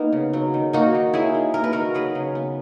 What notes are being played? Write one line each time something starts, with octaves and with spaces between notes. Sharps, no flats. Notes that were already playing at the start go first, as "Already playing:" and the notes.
Already playing: A#3 B3 D#4
C#3
F#3
D#3
A#3 D#4 F#4
D#3
F#3 E4 G#4
D#3
A#3 A#4
B4
D#3 F#4 A#4
F#3 G#4 B4
C#3
B3